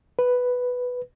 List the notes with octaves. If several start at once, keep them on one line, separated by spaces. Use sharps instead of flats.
B4